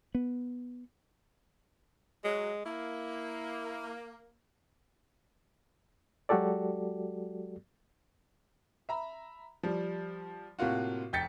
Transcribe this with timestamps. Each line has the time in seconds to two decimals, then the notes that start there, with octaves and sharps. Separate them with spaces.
0.15 B3
2.24 F#3 G#3
2.66 A#3 E4
6.29 F#3 G#3 F#4 G4 A4 D5
8.89 E5 A#5 B5
9.63 F3 G3
10.59 A2 C3 A#3 F4 F#4
11.13 F1 G5 G6 A6 B6 C#7